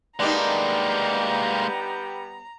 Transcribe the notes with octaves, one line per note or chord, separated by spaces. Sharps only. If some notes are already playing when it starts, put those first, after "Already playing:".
G3 G#3 A#3 B3 D4 D#4 G4 A#5